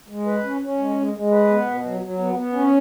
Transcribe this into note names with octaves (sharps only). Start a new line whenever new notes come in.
G#3
B4
C#4
C#4
G#3
G#3
G#3
B4
B3
B2
F#3
F#3
B3
B3
C#4